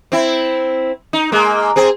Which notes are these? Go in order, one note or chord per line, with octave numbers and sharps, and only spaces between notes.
C4 E4
D#4
G#3 A#3
C4 G#4 C5